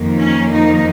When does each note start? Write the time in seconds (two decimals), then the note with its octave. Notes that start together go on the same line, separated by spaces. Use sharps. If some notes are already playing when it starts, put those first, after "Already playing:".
Already playing: F2 D#3 A#3
0.20 C#4
0.51 D#4